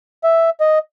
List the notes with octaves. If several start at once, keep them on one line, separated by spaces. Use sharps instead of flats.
E5
D#5